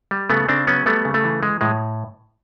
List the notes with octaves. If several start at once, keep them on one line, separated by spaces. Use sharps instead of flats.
G3
C#3 A3 B3
C#3 C4 D4
F#3 B3 C#4
G3 A3 B3
C#3
A3
E3
G#3
A2 G#3